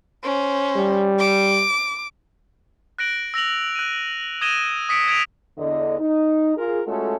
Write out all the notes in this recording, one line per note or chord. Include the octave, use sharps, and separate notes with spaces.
C#4 C5
G3
D6
F#6 A#6 D7 F#7
E6 A#6 F7 F#7
F#6 D#7
D#6 G#6 A#6 D#7 E7 G7
D#6 B6 C#7 D7
G#6 B6 D7 D#7 F7
E2 D3 D#5
D#4
F4 G#4 A#4
G#3 A3 C#4 F4 F#4 A4